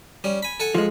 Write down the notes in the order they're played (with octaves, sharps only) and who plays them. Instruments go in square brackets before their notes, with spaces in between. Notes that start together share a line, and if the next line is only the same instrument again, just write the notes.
[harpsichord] G3 C#4
G#5 B5
A4 F#5 G#5
[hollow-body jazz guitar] F3 G#3